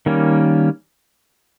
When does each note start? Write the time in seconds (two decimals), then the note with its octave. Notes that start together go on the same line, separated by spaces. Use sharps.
0.06 D#3 G3 A#3 C#4